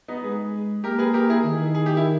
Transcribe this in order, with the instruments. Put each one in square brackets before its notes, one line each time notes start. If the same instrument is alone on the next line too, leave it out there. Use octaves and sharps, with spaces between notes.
[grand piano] B3 D#4
[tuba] G#3 [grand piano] G#4 B4
[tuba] A#3 [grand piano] G4 A#4
[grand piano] G#4 B4
G4 A#4
E4 G#4
[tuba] D#3
[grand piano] G#4
G4
E4